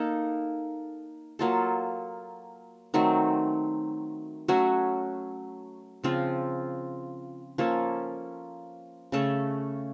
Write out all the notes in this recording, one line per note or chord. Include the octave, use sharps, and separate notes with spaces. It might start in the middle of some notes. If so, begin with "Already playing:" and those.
Already playing: A#3 D#4 A4
F#3 A#3 F4 A4
D#3 F#3 A3 C4
F#3 A3 C#4 F#4
C#3 F3 C4 F4
F3 A#3 C#4 A4
C#3 A3 C#4 A4